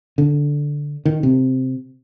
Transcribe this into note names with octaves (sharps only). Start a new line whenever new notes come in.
D3
D#3
C3